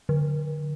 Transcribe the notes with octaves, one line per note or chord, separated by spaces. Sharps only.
D3